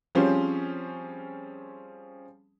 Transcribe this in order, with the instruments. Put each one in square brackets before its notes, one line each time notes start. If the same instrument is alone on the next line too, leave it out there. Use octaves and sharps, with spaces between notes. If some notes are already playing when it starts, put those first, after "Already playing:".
[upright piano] F3 G3 C4 C#4 G#4 C5